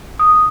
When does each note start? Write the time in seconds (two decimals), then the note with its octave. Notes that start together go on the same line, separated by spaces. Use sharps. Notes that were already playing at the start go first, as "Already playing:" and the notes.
0.19 D#6